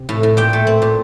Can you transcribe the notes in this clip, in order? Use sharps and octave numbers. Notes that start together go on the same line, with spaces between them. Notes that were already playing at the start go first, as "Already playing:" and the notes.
Already playing: C3
A2
A2
A#2 G5
A3
C4
A#2